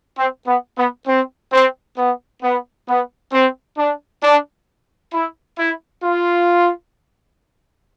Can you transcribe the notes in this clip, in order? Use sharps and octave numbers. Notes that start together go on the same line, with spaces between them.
C4
B3
B3
C4
C4
B3
B3
B3
C4
D4
D4
E4
E4
F4